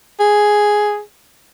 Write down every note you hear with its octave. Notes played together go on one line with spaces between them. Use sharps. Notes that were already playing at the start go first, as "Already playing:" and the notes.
G#4